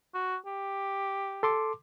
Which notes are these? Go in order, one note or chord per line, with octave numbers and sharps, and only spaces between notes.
F#4
G4
A4 C6 D6